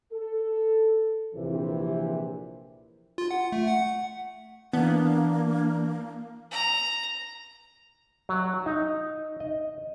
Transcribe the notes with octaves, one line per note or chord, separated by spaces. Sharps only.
A4
A#1 C3 E3
F4
F#5
A3
F#5
E3 A#3 B3 D4
A#5
F#3
D#4
D#5